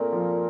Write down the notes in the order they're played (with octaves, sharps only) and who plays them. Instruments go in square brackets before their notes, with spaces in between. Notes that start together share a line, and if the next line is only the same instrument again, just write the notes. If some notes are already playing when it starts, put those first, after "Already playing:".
Already playing: [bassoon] A#2 [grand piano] A3 A#3 C4
[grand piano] F3